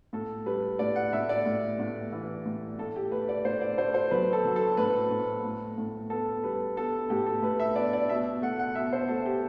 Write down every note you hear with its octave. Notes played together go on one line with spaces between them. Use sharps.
A2 A4
G3 B4
A2 D5
F#5
A2 E5
D5
A2
A2
E3
A2
A2 A4
G4
A3 B4
D5
A2 C5
D5
A3 C5
C5
F#3 B4
A4
F#3
A4
A2 B4
A2
A2
A2
B3 A4
G3 B4
B3 A4
A2 G4
A4
A2 B4
E5
B3 D5
D5
B2 E5
A3 F#5
F#5
B2 E5
C5
A3 A4
G4